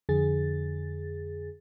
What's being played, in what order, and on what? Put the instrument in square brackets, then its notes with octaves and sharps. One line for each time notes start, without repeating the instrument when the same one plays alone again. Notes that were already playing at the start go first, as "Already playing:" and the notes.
[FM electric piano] F2 D3 G#4 A6